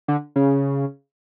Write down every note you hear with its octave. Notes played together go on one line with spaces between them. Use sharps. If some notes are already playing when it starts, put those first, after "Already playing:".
D3
C#3